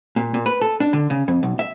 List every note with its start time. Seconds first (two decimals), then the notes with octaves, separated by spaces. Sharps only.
0.16 A#2
0.34 A#2
0.46 B4
0.61 A4
0.80 D4
0.93 D3
1.10 C#3
1.28 F2
1.43 B1
1.59 E5